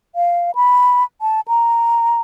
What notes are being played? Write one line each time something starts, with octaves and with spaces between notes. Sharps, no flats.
F5
B5
A5
A#5